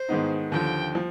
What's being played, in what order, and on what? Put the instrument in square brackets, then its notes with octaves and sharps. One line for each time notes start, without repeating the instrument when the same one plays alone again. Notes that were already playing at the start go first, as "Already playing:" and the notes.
Already playing: [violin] C5
[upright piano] G#2 D#3 G#3 B3 D#4
[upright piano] D#2 D3 F3 [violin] G5
[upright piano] F3